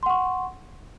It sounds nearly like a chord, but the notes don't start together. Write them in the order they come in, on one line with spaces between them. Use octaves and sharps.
C6 F#5 C#6